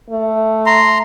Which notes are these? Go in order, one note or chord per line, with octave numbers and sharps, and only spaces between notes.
A3
A#5 C6